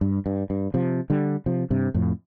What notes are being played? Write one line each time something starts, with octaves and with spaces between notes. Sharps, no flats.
G2
G2
G2
C3 F3
D3 G3
C3 F3
G2 C3
F2 A2